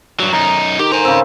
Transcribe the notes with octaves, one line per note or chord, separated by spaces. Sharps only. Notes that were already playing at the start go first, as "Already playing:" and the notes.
G2 F#3
F#2 D#4 A#5
D#3 G4
C5 G#5 A#5
C#3 C4